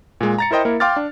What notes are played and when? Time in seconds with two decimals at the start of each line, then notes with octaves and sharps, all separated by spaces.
0.21 A#2 G#3
0.38 A#5 A6 C#7
0.51 E4 A#4 C5 D#5 G5
0.65 A#3 E4 A#4
0.80 F5 G5 C6 D6 F6 A6
0.96 D4